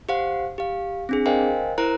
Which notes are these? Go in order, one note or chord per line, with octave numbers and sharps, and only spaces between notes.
G4 C5 F5 F#5
G4 F5
C4 D4 G#4
A#4 C5 D#5 F5 G5 G#5
E4 A#4 C5 A#5 F#6